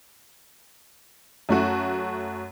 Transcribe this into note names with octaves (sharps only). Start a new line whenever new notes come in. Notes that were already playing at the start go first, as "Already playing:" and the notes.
F#2 A3 F#4